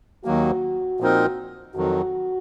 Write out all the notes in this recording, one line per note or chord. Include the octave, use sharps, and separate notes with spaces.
D#2 D#3 F#3 A#3 F#4
A#2 F3 C4 D#4 A#4
F2 D#3 F#3 F#4